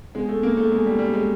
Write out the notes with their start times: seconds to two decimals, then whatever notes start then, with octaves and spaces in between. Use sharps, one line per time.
0.15 B2 G#3
0.29 A3
0.43 B2 A#3
0.57 A3
0.72 B2 G#3
0.86 G3
0.99 G3
1.14 G#3